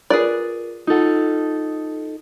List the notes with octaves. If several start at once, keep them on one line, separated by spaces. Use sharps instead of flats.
F4 G#4 A#4 B4 D5
D#4 F4 A4 F#5